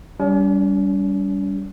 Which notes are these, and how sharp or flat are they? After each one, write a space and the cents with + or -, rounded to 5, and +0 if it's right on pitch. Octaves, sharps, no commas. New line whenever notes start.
G3 +0 C#4 +45